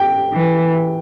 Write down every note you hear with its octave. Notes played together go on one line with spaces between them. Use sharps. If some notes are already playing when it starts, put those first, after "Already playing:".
Already playing: G5
E3